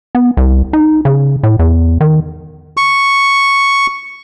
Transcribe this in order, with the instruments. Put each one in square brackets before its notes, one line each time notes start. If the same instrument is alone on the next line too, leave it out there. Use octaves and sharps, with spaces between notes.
[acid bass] B3
C2
D#4
C#3
A2
E2
D#3
[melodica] C#6